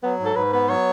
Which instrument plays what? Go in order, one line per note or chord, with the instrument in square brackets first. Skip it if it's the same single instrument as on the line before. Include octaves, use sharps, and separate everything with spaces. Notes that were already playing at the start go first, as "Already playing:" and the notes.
[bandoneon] F#3 [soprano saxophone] B3
[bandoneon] G#2
[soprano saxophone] A4
[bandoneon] G#2 [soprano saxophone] B4
[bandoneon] B3 [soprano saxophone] B4
[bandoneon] F#3 [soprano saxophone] C#5